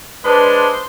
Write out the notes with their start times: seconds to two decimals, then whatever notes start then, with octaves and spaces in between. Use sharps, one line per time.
0.24 G#3 D4 B4 C5